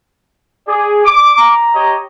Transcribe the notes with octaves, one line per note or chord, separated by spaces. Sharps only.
G#4 D5
D6
A#5
G4 C#5 D#5